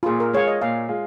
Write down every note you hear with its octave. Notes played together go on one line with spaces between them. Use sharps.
F4
A#2 G#4
A#4
G#3 F4 C#5
D#5
A#2 F5
G#3 F4